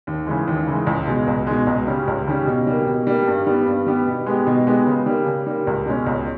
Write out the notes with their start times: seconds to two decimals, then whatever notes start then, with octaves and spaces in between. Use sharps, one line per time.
0.07 D#2
0.27 C#3 E3 G#3
0.48 D#2
0.68 C#3 E3 G#3
0.87 C#2
1.07 B2 G#3
1.27 C#2
1.47 B2 G#3
1.67 C#2
1.87 C#3 G3 C#4
2.07 C#2
2.27 C#3 G3 C#4
2.47 B2
2.67 G3 A#3
2.86 B2
3.07 G3 A#3
3.27 G2
3.47 G3 B3 G4
3.67 G2
3.87 G3 B3 G4
4.07 B2
4.26 G#3 B3 G4
4.47 B2
4.67 G#3 B3 G4
4.86 C#3
5.06 G3 A#3
5.26 C#3
5.47 G3 A#3
5.67 C#2
5.86 B2 G#3 C#4
6.06 C#2